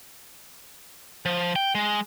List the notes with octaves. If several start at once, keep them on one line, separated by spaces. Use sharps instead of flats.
F3
G5
G#3